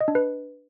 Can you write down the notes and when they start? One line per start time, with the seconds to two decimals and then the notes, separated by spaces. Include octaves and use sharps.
0.01 D#5
0.08 D4
0.15 B4